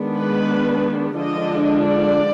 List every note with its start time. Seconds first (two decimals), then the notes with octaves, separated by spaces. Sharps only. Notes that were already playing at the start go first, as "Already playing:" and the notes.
Already playing: D#3 G#3 B3 D4
0.17 B4
1.18 D3 F3 G#3 D4 D#5
1.86 D5